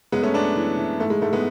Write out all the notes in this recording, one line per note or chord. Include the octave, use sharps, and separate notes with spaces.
F#2 G#3 B3
A3 C#4
F#2 B3 D4
E3
E3
G#2 A3
G#3
G#2 A3
G#3 B3